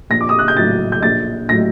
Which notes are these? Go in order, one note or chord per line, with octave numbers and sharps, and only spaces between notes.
A#1 A#6
D6
D#6
F#6
G6
A2 F#3 A6
G6
A#1 A6
A2 F#3 A#6